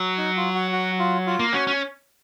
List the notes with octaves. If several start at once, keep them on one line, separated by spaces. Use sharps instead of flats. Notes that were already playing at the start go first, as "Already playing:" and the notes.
Already playing: F#3
D#4
F4
F#4
F#4
F4
F4
A#3
C#4 F#4
C#4